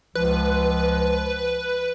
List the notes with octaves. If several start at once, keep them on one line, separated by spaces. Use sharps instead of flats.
C#2 F3 B4